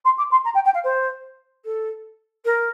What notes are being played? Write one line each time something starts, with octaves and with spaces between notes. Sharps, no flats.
C6
D6
C6
A#5
G5
G5
F5
C5
A4
A#4